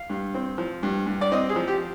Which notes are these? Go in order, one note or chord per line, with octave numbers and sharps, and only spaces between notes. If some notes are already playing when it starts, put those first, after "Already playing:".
Already playing: F5
G2
C4
F3
G2
G2
D5
C4 D#5
G#4
F3
G4